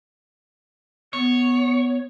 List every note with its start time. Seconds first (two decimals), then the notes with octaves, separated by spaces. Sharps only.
1.13 B3 C#5